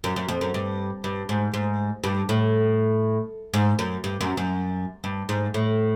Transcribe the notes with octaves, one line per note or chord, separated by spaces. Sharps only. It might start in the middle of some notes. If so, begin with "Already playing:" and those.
F#2
F#2
F2
F#2
G2
G2
G#2
G#2
G2
A2
G#2
F#2
G2
F#2
F#2
G2
G#2
A2